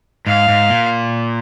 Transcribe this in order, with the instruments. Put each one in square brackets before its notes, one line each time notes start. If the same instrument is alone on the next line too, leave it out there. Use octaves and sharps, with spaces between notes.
[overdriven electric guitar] G#2 [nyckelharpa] F5
[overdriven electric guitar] G#2
A#2